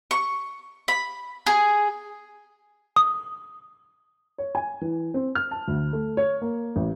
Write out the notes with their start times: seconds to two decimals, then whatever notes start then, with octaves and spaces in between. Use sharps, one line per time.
0.11 C#6
0.88 B5
1.47 G#4
2.96 D#6
4.38 C#5
4.55 G#5
4.81 E3
5.14 C4
5.35 F6
5.51 A5
5.68 D2
5.93 A3
6.17 C#5
6.42 A#3
6.76 A1